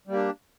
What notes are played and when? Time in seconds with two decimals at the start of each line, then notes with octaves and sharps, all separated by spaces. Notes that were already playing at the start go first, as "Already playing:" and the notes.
0.07 G3
0.10 A#3
0.13 G4
0.16 D4